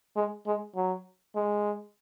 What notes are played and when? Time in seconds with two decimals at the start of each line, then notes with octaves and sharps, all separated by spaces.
0.16 G#3
0.46 G#3
0.76 F#3
1.35 G#3